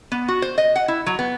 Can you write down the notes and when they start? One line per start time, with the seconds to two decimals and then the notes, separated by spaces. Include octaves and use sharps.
0.12 B3
0.28 F#4
0.42 C5
0.58 D#5
0.76 F#5
0.88 E4
1.06 F#3
1.19 B3